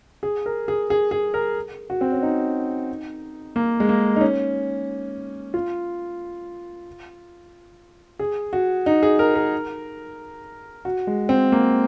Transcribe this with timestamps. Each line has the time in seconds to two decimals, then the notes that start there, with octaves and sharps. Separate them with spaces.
0.23 G#4
0.46 A#4
0.68 G#4
0.90 G#4
1.11 G#4
1.34 A#4
1.90 F#4
2.01 C4
2.12 C#4
2.22 D#4
3.56 A#3
3.80 G#3
3.89 A#3
4.16 D#4
4.21 C#4
5.54 F4
8.19 G#4
8.53 F#4
8.86 D#4
9.03 G#4
9.19 A#4
9.35 A#4
10.85 F#4
11.07 G#3
11.29 C4
11.52 A#3